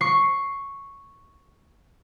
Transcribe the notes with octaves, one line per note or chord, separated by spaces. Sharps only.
C#6 C7